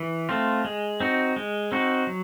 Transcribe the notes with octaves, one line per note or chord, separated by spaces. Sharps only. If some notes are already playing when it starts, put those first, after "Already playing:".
Already playing: E3
A3 C4 F4
G#3
C4 D#4 F#4
G#3
C4 D#4 F#4
F#3